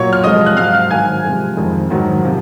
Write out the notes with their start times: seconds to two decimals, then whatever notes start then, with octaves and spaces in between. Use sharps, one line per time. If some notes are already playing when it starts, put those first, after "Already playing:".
Already playing: A#2 F#3 C#5 C#6
0.13 F6
0.24 C3 F3 G#3 D#5 D#6
0.46 F#6
0.57 G#2 F#3 F5 F6
0.74 F5 F6
0.90 G#2 D#3 F#3 G#5 G#6
1.24 C3 F3 G#3
1.57 F2 D#3 G#3
1.90 G#2 D#3 F#3
2.24 C3 F3